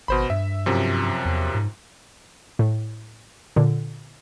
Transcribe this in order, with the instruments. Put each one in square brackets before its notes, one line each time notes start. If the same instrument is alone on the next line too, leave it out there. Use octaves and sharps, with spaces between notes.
[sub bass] G#1 [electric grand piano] B2 C5 B5
[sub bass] G2 [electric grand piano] E5
[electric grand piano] F#2 C3 F3
[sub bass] E2
G#2
[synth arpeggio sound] A2
A#2 D3